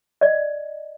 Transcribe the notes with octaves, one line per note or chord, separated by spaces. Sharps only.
D5 D#5